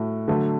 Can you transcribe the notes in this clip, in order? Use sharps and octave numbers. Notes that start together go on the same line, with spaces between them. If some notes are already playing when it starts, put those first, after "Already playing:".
Already playing: A2 A3 F#4
D3 F#3 A3